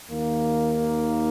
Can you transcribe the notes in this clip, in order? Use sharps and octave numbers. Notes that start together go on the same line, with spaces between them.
D#2 D#3 A#3